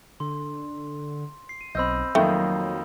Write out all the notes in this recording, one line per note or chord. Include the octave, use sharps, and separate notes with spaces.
D3 C6
C7
D#7
B1 C4 D#5 B5 E6 G6
F2 D#3 F#3 A3 A#3 G5